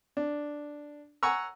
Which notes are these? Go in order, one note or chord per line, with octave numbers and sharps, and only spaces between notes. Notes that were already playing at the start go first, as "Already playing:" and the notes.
D4
F#5 G#5 A#5 C#6 E6